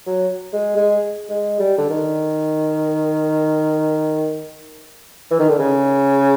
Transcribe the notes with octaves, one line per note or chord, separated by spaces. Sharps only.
F#3
G#3
G#3
G#3
G3
D3
D#3
E3
D#3
D3
C#3